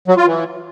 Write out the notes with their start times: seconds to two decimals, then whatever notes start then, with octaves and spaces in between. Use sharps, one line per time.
0.08 F#3
0.17 F4
0.26 E3